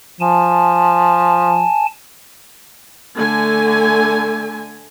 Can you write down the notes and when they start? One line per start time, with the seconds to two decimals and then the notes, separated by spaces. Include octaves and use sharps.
0.20 F3 G#5 A5
3.16 D3 A3 G#5